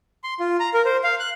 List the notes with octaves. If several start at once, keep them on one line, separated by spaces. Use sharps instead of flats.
C6
F4
A#5
A#4
C5
F5
F#6